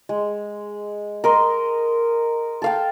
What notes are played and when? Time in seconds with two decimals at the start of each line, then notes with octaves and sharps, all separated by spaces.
0.09 G#3
1.24 A#4 D#5 C6
2.62 A4 F5 G5